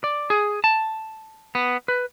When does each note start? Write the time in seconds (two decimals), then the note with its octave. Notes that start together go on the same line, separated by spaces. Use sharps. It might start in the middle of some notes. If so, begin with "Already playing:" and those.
0.04 D5
0.30 G#4
0.64 A5
1.55 B3
1.88 B4